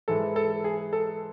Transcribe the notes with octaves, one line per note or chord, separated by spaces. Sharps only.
G#2 E3 G#3 A4
A4
G#4
A4